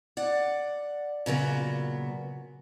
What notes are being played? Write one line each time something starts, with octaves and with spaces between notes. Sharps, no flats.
D5 F#5
A#2 C#3 F#3 B3